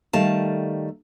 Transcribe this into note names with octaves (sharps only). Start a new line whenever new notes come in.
D#3 G3 A3 F5 A5